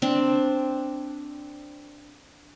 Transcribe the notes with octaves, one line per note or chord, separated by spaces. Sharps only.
C4 D4